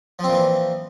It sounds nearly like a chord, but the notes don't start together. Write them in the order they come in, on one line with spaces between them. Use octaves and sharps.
F3 C4 A#2 E3